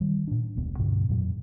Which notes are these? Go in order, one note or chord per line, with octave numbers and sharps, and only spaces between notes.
D#3 G3
A#2 D4
E1 C#2 B3
G2 B2 D3 C#4
F2 A#2 F#3